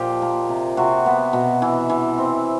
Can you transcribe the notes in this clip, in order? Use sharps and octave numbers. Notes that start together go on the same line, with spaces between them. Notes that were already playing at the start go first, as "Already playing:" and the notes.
Already playing: A#2 F3 F4 G4 D#5
A#3
C3
C3 F#4
B3
B2
E3
E3
C4